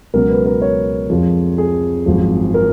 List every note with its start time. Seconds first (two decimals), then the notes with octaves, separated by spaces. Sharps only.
0.14 C#2 B2 F#3 C#4 A#4
0.30 B4
0.46 A#4
0.62 C#5
1.10 F2 F3 G#3
1.58 G#4
2.06 G#1 F#2 F3
2.54 A#4